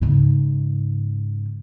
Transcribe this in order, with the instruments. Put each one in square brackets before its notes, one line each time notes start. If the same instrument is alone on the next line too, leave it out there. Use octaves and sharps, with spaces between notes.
[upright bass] G#2 C#3